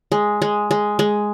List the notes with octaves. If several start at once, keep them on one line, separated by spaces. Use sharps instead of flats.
G#3
G#3
G#3
G#3